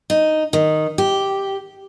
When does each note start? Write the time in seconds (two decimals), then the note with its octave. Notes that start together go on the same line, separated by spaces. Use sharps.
0.10 D#4
0.53 D#3
0.98 G4